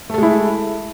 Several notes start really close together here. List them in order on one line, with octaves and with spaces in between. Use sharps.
A3 A4 G#3 E4